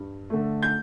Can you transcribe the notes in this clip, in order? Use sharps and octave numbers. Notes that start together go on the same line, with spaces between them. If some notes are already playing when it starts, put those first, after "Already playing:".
Already playing: G2
D3 A3
G6